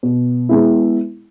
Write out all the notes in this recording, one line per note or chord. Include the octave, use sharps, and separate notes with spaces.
B2
G#3 B3 E4